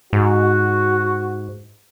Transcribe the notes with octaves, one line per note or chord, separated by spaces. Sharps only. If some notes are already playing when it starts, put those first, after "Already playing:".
G#2 F#4